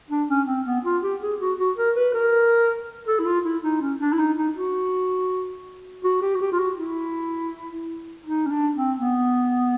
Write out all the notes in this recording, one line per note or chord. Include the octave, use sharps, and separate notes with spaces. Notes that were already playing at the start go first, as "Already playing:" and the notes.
D4
C#4
C4
B3
F4
G4
G#4
F#4
F#4
A#4
B4
A#4
A4
E4
F4
E4
D#4
C#4
D4
E4
D#4
D#4
F#4
F#4
G4
F#4
G4
F4
F#4
E4
D#4
C#4
D4
C4
B3